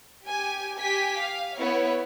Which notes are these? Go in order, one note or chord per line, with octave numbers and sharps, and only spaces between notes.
G4 G#5
G4 G#5 B6
F5
B3 E4 C#5